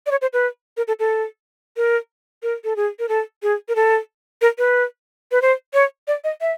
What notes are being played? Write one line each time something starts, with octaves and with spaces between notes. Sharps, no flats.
D5
C#5
C5
B4
A#4
A4
A4
A#4
A#4
A4
G#4
A#4
A4
G#4
A#4
A4
A#4
B4
B4
C5
C#5
D5
D#5
E5